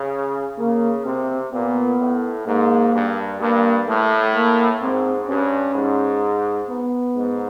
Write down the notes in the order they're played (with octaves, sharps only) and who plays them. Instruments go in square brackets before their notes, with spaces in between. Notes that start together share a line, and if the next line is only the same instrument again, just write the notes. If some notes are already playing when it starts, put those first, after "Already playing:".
Already playing: [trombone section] C#3
[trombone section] C#3 [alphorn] A#3
[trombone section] C3 [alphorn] C4
[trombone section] A#2 [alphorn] B3
[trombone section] A2
[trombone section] G#2 [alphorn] A#3
[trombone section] G2
[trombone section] G2 [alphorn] A#3
[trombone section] A2 [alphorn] A3
[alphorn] A#3
[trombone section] G#2 [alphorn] C4
[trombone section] G2 [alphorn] C#4
[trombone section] G#2
[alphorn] B3
[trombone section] G#2